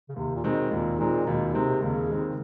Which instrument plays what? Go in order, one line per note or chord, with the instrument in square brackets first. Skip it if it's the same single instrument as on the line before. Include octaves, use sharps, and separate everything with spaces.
[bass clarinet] C#3
[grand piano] D#2 [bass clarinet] C3
[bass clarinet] A#2
[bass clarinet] B2 [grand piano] D#3 G#3 C4
[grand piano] D#2 [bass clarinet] A#2
[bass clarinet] A#2 [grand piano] D#3 G#3 C4
[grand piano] D#2 [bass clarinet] B2
[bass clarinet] C3 [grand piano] D#3 G#3 C4
[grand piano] D#2 [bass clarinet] C#3
[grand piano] D#3 G#3 C4